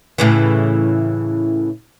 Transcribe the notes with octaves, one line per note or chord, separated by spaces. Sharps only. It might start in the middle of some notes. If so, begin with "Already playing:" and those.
A2 C#3 E3